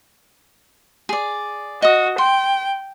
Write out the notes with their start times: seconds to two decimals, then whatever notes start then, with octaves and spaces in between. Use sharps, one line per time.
1.09 G#4 D5
1.82 F#4 D#5 D#6
2.18 G5 C6